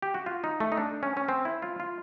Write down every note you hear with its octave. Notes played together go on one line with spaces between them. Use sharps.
G4
F#4
F4
D#4
A3
D#4
D4
C#4
C#4
C4
E4
F4
F4